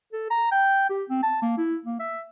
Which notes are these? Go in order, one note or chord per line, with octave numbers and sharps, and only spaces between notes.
A4
A#5
G5
G4
C4
A5
A#3
E4
A#3
E5